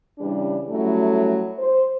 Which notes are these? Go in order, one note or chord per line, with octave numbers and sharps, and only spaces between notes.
C#3 E3 G3 D4
F#3 G3 A3 C#4 E4
C5